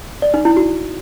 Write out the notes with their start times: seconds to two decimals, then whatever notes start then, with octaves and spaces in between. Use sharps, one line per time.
0.22 D5
0.34 D#4
0.45 E4
0.57 F#4